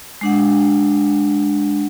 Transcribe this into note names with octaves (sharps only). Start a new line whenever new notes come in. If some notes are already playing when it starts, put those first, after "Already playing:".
G#3 D4 F#5